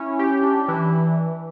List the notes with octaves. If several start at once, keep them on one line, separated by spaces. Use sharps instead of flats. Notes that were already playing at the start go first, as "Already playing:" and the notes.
Already playing: C#4 E4
G4
D4
E3